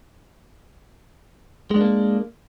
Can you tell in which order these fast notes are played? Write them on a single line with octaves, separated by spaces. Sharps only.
G#3 D4 A#3